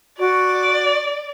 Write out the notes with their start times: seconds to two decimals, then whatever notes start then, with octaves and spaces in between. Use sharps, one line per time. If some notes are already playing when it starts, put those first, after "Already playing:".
0.19 F#4 D5